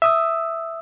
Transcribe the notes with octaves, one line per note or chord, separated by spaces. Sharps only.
E5 D#6 E6